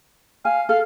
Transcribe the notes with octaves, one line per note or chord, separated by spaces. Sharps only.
F5 G#5
A4 F5